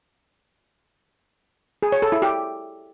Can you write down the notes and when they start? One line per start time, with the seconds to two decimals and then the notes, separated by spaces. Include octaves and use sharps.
1.83 G#4
1.92 C#5
2.02 A4
2.12 E4
2.22 G4